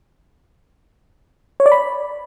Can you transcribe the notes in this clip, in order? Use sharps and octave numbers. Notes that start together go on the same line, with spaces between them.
C#5
D5
B5